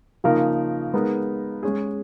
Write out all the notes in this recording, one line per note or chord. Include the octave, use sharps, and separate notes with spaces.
C#3 F3 A#3 D#4 A#4
G#3 B3 D#4 A#4
G#3 C#4 G#4